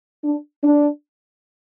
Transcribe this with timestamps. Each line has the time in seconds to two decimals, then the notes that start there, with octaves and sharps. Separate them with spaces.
0.24 D4
0.64 D4